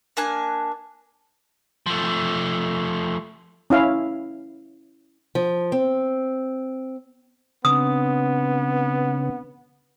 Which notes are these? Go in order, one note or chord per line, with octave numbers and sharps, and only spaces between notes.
A#3 D4 G#5 F#6
F3 A3
C#4 E4 F5
F3
C4
C#3 B3 C4 D4 D#6